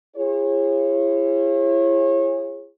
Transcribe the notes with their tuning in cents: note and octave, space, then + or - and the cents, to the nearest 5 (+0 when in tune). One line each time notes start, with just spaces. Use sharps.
E4 +40 G#4 -30 C#5 -35